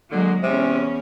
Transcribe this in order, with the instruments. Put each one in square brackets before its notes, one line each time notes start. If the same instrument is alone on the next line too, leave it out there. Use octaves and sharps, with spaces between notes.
[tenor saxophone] D3 [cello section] F#3 G#3 A#3
[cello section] E2 C#4 [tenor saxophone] C3